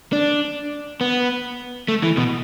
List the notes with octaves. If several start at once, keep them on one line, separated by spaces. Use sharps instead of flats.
D4
B3
A3
E3
B2